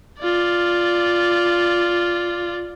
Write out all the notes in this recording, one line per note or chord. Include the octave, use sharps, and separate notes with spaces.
F4 D5